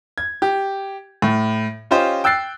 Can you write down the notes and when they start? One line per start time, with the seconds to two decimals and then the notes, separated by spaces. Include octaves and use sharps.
0.18 G#6
0.42 G4
1.22 A2
1.91 C#4 F4 G4 C5 D#5
2.24 G5 E6 F#6 A6 C7